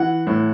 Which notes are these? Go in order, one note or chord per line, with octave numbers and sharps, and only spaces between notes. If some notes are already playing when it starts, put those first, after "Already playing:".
Already playing: E3 F#5
A2